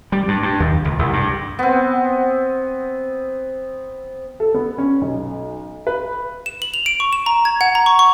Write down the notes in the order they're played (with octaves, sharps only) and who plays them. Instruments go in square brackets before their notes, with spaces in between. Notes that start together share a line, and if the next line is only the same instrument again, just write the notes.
[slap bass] G3
G2
G2
D#2
C#2
C2
G2
[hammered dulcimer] B3 C4
[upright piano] A4
B3
C#4
B1
B4
[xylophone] E7
F#7
F7
D7
C#6
E7
A#5
G#6
F#5
A#5
C#6
C#6